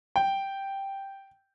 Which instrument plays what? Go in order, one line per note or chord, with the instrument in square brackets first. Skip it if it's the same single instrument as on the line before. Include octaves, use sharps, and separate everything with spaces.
[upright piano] G5